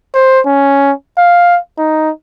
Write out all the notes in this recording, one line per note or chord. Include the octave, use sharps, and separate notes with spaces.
C5
C#4
F5
D#4